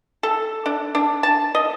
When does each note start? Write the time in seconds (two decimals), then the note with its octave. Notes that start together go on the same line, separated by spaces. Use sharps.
0.23 A4
0.66 D4
0.95 D4
1.23 A5
1.55 D#5